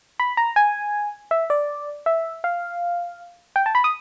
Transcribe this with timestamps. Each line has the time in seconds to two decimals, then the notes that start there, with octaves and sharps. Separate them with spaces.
0.20 B5
0.37 A#5
0.56 G#5
1.31 E5
1.50 D5
2.06 E5
2.44 F5
3.56 G5
3.66 A5
3.75 B5
3.84 D#6